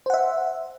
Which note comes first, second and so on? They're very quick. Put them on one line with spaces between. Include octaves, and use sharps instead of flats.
C5 F#5 E5